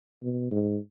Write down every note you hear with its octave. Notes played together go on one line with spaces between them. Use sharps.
B2
G#2